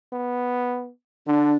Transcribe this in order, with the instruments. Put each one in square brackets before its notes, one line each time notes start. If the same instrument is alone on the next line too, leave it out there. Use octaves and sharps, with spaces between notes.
[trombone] B3
[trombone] D3 [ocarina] D4